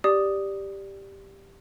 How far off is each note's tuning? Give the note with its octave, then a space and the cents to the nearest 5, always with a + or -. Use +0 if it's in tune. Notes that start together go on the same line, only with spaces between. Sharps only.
G4 +0 D5 +0 D#6 +0